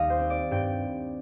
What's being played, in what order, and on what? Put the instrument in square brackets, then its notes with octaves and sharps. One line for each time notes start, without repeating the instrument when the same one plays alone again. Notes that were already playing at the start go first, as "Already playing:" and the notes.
Already playing: [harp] D#2 G3 D#5 F5
C5
C4
D5
G2 G5